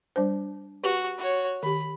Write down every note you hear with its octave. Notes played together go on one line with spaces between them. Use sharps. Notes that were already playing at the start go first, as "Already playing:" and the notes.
G3 D4 C5
F#4 G4 B4
F#4 C#5
D#3 G4 B5